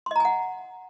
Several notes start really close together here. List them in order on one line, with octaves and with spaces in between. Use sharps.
C6 D#5 A#5 G#5 F#5